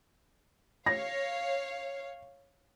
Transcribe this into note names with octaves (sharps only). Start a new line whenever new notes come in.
C#5 F5 A#6